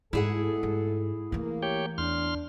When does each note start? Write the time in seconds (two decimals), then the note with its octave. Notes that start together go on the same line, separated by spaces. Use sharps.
0.13 G#2 B2 A3 E4 G#4 A4 F#5
0.63 G#2
1.32 E3 A3 A#3
1.63 G4 C#5 G5
1.98 E2 D4 C6 F6